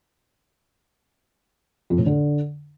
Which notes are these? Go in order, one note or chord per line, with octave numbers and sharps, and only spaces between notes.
F2
A2
D3